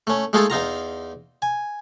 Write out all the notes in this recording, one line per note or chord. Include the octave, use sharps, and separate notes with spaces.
A3 C#4
G#3 A3 D#4 F4 G#4 A4
E2 D#4 F4 A#5
G#5